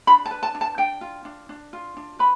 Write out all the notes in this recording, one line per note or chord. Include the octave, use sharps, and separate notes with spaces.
D4 B5
A5
B4
A5
D4
A5
D4 G5
F4
D4
D4
F4
D4
B4 B5